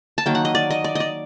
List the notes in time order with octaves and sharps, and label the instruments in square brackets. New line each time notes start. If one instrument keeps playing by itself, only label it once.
[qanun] A5
D#3 F#3 A#3 G5
F#5
D#5
D5
D#5
D5
D5 D#5